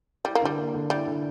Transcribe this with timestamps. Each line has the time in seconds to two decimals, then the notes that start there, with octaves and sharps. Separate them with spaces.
0.25 G3 E4
0.35 A#3
0.42 D3 G3
0.57 A#3
0.74 D3
0.90 G3 E4
1.07 D3